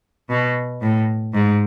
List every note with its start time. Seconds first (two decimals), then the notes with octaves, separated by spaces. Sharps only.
0.30 B2
0.82 A2
1.34 G#2